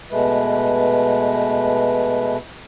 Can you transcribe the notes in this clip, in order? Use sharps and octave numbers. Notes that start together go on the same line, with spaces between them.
B2 G#3 A3 B4